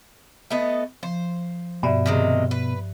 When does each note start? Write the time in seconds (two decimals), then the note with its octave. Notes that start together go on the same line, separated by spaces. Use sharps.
0.51 A3 B3 D#5
1.03 F3 C5
1.83 G2 B2 D5 E5
2.06 C3 D#3 G#3
2.51 B4